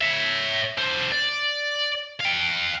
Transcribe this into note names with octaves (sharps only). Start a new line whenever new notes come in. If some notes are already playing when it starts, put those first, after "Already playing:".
C#5 E5
D3 C5
D5
F5 G5